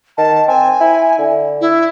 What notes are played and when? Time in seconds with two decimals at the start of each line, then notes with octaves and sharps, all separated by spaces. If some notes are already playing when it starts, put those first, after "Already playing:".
0.18 D#3 A5
0.48 C4 G#5
0.81 E4
1.19 D3
1.61 E4